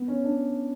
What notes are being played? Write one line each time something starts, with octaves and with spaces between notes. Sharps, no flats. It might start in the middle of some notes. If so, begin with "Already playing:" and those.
Already playing: B3
C#4
D4